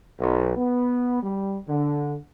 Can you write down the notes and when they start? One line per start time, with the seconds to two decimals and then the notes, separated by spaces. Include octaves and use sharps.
0.20 B1
0.56 B3
1.23 G3
1.68 D3